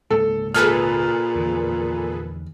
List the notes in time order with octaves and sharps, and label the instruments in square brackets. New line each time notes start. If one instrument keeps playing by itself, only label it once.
[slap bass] C#2 G#2 A#3 [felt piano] A4
[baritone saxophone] A#2 [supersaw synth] G#4 A4 B4 [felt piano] F6
[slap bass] E2 D3 F3